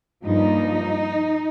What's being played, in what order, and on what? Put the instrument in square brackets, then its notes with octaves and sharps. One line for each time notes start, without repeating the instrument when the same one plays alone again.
[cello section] G2 F3 A#3 D#4